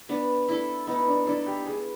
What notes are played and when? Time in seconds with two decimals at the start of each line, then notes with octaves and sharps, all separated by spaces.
0.09 B3 D4
0.48 D4 E4 A4
0.87 B3 D#4
1.08 D4
1.27 D4 E4 A4
1.46 G4
1.66 B3 G#4